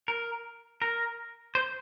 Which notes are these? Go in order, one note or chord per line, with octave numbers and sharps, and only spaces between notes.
A#4
A#4
C5